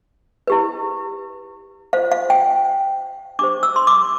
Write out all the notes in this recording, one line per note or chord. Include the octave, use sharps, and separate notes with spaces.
E4 G4 B4
F4 C5 F5
F5
G5
D4 G4 C5 D6
E6
C6
D6